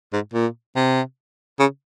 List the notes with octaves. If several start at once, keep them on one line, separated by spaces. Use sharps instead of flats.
G#2
A#2
C3
C#3